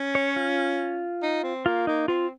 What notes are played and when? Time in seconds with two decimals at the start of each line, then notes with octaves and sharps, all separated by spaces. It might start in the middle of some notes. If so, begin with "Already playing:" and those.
Already playing: C#4
0.15 C#5
0.36 F4
1.22 D#4
1.43 C4
1.66 A#3 F4
1.87 A#3 D#4
2.08 C4 F4